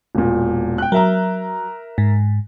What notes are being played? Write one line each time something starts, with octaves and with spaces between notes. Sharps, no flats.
E1 A#2
G5 F#6
F#3 A#4 E5 A#5
G#2